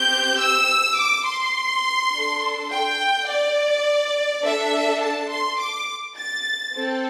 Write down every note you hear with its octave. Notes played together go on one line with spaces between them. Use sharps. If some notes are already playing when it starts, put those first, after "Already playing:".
Already playing: C4 G4 G6
E6
D6
C6
D4 A4
G5
D5
D4 A4 E5
A5
C6
D6
A6
C4 A4